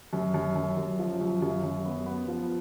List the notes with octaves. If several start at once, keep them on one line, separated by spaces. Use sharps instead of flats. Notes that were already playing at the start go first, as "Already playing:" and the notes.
F#2
F#2
F#2
F#2
F3
F#2
F#2
F#2
B3
B3
F3